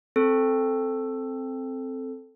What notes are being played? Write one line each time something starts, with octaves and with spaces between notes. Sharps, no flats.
C4 A4